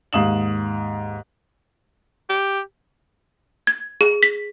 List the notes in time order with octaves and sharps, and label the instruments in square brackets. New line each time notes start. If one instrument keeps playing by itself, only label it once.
[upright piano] D#2 G#2 F5 D#6 E7 F#7
[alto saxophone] G4
[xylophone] G#6
G#4
B6